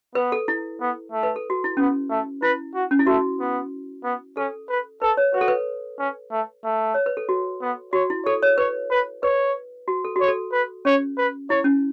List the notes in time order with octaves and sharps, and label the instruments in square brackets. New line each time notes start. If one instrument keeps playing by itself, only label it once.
[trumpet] B3 [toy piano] B4
[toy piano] A4
E4
[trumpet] B3
A3
[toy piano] B4
A4
F#4
E4
[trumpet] B3 [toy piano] C#4
[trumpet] A3
[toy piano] E4 [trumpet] B4
[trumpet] F#4
[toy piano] C#4
E4
[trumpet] A3 [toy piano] F#4
[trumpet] B3
B3
[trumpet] C#4 [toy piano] A4
[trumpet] B4
[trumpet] A4 [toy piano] B4
[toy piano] C#5
[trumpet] F#4 [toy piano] B4
[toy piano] A4
B4
[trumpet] C#4
A3
A3
[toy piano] C#5
B4
A4
F#4
[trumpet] B3
[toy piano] F#4 [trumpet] C#5
[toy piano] E4
[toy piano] A4 [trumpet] C#5
[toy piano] C#5
[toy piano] B4 [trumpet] C#5
[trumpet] B4
[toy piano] B4 [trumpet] C#5
[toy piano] F#4
A4
[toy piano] F#4 [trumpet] C#5
[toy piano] A4
[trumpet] B4
[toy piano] C#4 [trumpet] C#5
[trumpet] B4
[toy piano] E4 [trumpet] C#5
[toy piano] C#4